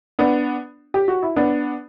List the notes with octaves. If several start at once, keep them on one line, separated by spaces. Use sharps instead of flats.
B3 D4
G4
F#4
E4
B3 D4